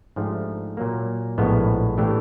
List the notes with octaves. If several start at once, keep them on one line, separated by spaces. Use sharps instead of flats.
G#2 F3 A3 D4 G4
A#2 F#3 A#3
A#1 A2 F3 G#3 B3
A2 E3 A3 D4 G4